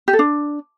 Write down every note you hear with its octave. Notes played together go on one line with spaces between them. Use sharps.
G4
A4
D4